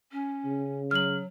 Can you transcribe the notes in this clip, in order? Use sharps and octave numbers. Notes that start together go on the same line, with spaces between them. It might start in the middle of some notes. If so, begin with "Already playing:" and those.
C#4
C#3
F#3 F6 F#7